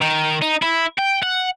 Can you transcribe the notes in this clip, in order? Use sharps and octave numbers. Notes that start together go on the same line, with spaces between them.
D#3
D#4
E4
G5
F#5